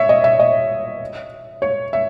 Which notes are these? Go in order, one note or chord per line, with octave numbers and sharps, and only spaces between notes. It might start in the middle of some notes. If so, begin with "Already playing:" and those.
Already playing: C#5 E5
D#5
E5
D#5
C#5
E5